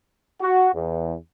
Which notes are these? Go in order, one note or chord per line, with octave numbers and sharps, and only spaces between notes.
F#4
E2